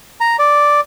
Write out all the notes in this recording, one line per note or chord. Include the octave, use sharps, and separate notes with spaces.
A#5
D5